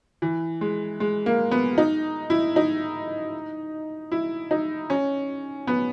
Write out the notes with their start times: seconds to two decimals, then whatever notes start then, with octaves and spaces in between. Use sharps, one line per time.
0.22 E3
0.61 G#3
1.00 G#3
1.26 A#3
1.51 B3
1.78 D#4
2.30 E4
2.56 D#4
4.12 E4
4.51 D#4
4.90 C#4
5.67 B3